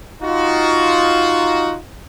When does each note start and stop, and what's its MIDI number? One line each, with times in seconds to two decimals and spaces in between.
0.22 1.75 63
0.22 1.75 65
0.22 1.75 66